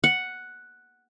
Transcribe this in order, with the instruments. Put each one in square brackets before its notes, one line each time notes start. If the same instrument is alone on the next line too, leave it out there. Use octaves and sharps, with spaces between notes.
[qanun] F#5